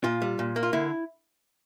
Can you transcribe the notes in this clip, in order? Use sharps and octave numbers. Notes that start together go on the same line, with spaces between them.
A#2 F4
G3
A#2
A#3
F4
D3 E4